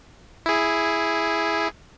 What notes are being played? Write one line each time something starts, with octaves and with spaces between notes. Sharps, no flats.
E4 G#4